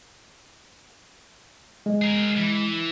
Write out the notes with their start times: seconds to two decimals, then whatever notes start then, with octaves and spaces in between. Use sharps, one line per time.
1.86 G#3
2.02 G#4 A#4
2.37 E3